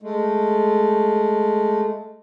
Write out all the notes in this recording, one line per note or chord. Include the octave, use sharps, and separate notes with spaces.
G#3 A3